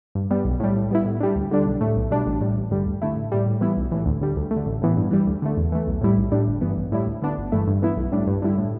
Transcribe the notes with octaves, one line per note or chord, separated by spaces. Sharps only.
G2
G3 B3
B1
A2 G3
A2
G3 B3 E4
A2
G3 D4
D2
D3 G3 D4
B1
A2 A3
B1
B2 G3 D4
A1
A2 G3
A1
G2 D3 G3
D2
D3 A3 E4
A1
A2 G3
A2
E3 G3 B3 E4
B1
A2 E3
D2
D3 G3
D2
A3
D3
A1
A2 E3 B3
G2
E3 G3
D2
D3 A3
E2
E3 A3
B1
A2 G3 E4
B1
A2 G3 D4
G1
G2 E3 B3
A1
A2 G3 E4
D2
D3 B3 D4
G1
G2 E3 A3 E4
G2
E3 B3 E4
B1
A2 G3 D4
G2
D3 G3 E4
A2